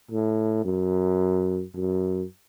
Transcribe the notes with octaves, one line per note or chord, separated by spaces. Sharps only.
A2
F#2
F#2